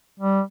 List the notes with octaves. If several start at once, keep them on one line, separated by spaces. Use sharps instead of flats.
G3